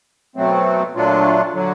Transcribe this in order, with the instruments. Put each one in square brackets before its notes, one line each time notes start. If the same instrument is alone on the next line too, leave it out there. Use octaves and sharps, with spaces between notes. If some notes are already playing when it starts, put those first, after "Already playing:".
[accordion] B2 F#3 A3 C4
A#2 F#3 A3 D4 F4
D3 F#3